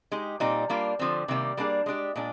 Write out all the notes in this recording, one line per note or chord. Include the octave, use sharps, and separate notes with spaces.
G#3 D#4 G4
A#2 G3 C4 D#4
G3 A#3 D4 F4
D3 F3 C4
C3 D#3 G3 A#3
G3 A#3 D4 G#4
G#3 D4 G4
A#2 G#3 D4